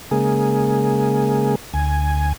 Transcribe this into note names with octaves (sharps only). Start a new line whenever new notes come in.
C#3 G#3 A#3 G#4
D2 G#5